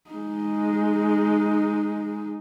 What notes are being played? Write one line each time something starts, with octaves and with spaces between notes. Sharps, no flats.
G#3 D#4